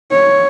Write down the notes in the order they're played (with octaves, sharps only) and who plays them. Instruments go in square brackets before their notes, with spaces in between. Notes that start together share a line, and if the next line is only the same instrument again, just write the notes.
[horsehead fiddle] C#5